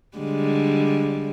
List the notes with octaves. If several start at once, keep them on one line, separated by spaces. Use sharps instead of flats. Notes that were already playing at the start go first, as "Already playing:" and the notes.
D3 G3 G#3